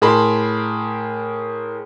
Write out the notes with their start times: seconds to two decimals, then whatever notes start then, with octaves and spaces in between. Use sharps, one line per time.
0.02 A2 G#4 A#4 A5 B5 C6